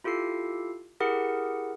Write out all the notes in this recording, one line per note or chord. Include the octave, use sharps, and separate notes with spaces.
E4 F4 G4 A4 C7
E4 G4 G#4 A#4 F#5